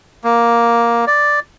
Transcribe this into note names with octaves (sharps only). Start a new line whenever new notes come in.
A#3
D5